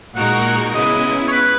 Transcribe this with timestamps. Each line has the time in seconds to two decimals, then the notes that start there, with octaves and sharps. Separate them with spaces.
0.15 A#2 G#3 D#4 F#4 A#4 F#5
0.73 C#3 G#3 B3 E4 D#5
1.28 C#5
1.32 B4